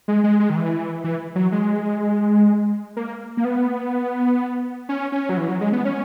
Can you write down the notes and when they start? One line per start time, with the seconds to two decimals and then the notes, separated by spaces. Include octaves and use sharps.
0.08 G#3
0.24 G#3
0.40 G#3
0.50 D#3
0.56 E3
1.04 E3
1.35 F#3
1.52 G#3
2.97 A#3
3.37 A#3
3.45 B3
4.89 C#4
5.12 C#4
5.29 F#3
5.37 E3
5.49 F#3
5.61 G#3
5.73 B3
5.85 C#4